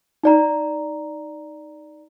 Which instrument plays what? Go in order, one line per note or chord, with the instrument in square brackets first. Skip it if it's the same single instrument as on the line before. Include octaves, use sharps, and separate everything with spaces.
[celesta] D#4 D5 A#5